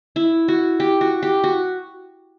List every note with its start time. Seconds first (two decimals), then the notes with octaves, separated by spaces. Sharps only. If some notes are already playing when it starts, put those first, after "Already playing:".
0.16 E4
0.48 F#4
0.80 G4
1.01 F#4
1.23 G4
1.44 F#4